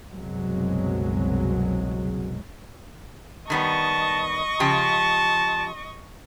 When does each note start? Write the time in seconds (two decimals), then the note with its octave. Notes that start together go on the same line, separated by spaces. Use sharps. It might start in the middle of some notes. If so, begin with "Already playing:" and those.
0.13 F#1 C2 B2 F#3 G#3
3.50 D#3 G3 B3 D#5 A5 C#6
4.60 C#3 F3 G4 A5